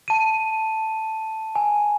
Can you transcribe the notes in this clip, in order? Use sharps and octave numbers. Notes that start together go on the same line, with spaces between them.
A5 D#7
G#5